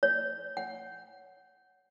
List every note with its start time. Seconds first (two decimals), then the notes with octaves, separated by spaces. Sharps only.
0.03 C#5
0.57 F#5